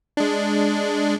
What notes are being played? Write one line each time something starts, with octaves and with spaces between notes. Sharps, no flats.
G#3 D4